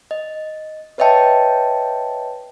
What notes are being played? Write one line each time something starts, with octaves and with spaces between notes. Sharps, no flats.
D#5
B4 C#5 D#5 E5 G5 A5